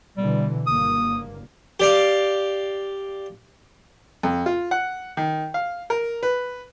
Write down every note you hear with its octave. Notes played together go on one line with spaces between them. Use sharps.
B2 D3 E3 G3
F#1 G2 A#3 D#6
G4 D5 F5
F2
F4
F#5
D#3
F5
A#4
B4